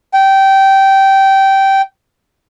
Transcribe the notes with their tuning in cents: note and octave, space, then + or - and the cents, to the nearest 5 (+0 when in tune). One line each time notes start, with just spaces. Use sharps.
G5 -15